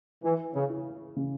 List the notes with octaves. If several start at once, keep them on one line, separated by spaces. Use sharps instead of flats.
E3 E4
C#3
E4
C#3